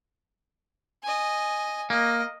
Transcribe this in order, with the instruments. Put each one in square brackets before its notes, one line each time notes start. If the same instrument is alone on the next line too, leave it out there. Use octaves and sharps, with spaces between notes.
[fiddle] D#5 G#5
[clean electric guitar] A#3 [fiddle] D#5